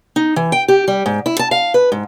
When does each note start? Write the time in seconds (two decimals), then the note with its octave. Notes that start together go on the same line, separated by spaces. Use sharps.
0.16 D#4
0.36 E3
0.52 G5
0.68 G4
0.88 G3
1.06 G#2
1.26 E4
1.39 A5
1.51 F5
1.74 B4
1.92 G#2